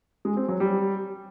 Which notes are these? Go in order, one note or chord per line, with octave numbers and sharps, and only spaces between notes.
G#3
C4
F#3
G3